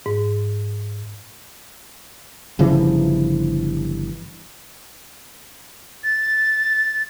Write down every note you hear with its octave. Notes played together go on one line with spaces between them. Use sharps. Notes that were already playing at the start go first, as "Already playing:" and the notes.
G#2
G1 C#3 E3 F3
A6